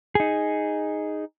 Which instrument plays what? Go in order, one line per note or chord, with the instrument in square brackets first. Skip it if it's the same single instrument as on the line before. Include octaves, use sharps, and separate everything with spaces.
[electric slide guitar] D#4 G#4